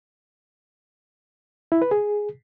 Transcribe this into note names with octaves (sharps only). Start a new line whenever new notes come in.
E4
B4
G#4